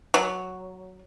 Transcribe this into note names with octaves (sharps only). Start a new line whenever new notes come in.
F#3